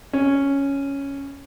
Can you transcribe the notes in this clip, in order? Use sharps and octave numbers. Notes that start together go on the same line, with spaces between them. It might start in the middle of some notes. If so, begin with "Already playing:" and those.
C#4